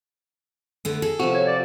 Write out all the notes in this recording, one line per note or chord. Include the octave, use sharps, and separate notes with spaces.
D3 A3 B3
G#4 A4
C3 F3 F#4
C#5
D5